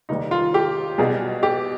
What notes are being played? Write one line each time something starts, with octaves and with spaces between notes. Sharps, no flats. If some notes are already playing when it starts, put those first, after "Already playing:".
F1 D#2 D#3 G3 D#4
F4
G4
B1 B2 G3 G#4
G4